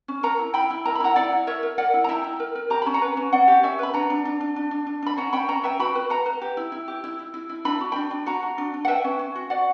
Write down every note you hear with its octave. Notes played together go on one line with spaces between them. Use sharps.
C#4
A#4 F#5 A#5
E4
E4 G5 B5
E4
A#4 A#5
B5
E4 F#5 A#5
E4 D5 F#5
E4
A#4 C#5 E5
A#4
A#4 D5 F#5
E4
A#5
E4 E5 G5
E4
A#4
A#4
G4 A#5
C#4 B5
F#5 A#5
B4
C#4
C#4 D5 F#5
G4
C#4 C#5 E5
B4 B5
D4 F#5 A#5
D4
D4
D4
D4
D4
D4
D4 B5
C#4 F#5 A#5
C#4 G5 B5
C#4 F#5 A#5
B4 E5 G5
F#4 G5 B5
B4
B4 F#5 A#5
B4
G4
E4
E4
G4
E4
E4
E4
E4
D4 B5
F#4
D4 G5 B5
D4
F#4 F#5 A#5
F#4
D4
D4
F#5
B4 E5 G5
C#4
C#4
F#4
F#4 D5 F#5